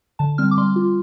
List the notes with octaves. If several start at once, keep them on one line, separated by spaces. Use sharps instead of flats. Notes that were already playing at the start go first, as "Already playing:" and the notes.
D3 A5
G3 C4 F6
D6
G3 C6
F4